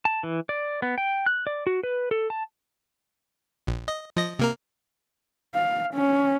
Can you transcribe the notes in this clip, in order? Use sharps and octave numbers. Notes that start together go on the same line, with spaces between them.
A5
E3
D5
B3
G5
F#6
D5
F#4
B4
A4
A5
A#1
D#5
F3 D#5 A#6
C3 A#3 A#4
F5
C#4